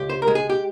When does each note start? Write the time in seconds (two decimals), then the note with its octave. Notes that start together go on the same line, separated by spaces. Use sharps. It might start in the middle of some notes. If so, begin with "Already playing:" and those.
Already playing: C#2 G4
0.10 C5
0.22 A#4
0.28 G#3
0.35 G#4
0.50 G4